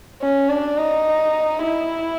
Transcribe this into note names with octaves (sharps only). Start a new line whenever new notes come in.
C#4
D4
D#4
E4